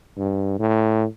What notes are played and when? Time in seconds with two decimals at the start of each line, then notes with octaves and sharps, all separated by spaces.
0.17 G2
0.59 A2